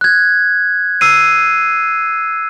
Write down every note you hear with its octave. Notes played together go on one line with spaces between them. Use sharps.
F#6 G#6
E6 C7 D#7